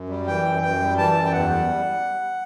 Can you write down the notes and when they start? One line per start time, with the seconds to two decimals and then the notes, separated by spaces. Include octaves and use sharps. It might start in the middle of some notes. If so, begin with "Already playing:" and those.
Already playing: F#2
0.09 G3
0.27 E3 G5
0.45 F#2
0.62 F#2 G5
0.80 G3
0.97 E3 A5
1.15 F#2
1.25 G5
1.32 E2 F#5
1.50 G3